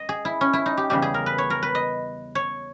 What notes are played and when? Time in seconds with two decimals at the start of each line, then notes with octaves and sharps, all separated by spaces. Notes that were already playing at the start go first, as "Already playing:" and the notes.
Already playing: D#5
0.09 G#4
0.25 E4
0.41 C#4
0.53 E4
0.66 D#4
0.77 G4
0.90 E2 C#3 G3 G4
1.02 G#4
1.14 A#4
1.26 B4
1.38 C#5
1.50 A#4
1.62 B4
1.75 D#5
2.35 C#5